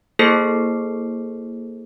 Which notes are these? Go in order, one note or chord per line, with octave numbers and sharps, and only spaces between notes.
A#3 E4 G#4 A4 C5 C7